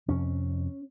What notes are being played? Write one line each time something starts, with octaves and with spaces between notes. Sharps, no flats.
F2 C3 C#4